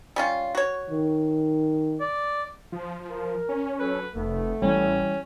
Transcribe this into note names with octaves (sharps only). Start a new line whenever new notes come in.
G3 C#4 F4
F#4 C#5
D#3
D5
F3
A#4
C#4
F#3 A4 B4
F1 A3 B3
A1 E3 G3 C#4